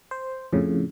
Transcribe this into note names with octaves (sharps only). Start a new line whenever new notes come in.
C5
F2 A2 C#3